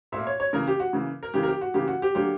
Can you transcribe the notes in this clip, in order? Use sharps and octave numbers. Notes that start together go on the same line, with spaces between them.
A#2 A#3 E5
C#5
C#5
C#3 E3 A#3 A#4
G4
F#4
C#3 E3 A#3
A#4
C#3 E3 A#3 G4
A#4
G4
F#4
C#3 E3 A#3 G4
F#4
G4
D3 F#3 A#3 G4